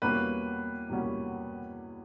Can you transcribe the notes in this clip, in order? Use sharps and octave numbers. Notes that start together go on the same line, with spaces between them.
E2 B2 G3 A#3 C#4 B4
E2 B2 G3 A#3 C#4